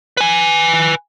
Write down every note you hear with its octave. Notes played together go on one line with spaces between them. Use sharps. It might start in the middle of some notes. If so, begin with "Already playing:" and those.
B4 G#5